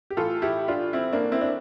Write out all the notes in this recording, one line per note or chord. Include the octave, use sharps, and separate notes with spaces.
G4
A2 E3 F4 A4
E4 G4
D4 F4
C4 E4
A#3 D4
C4 E4
D4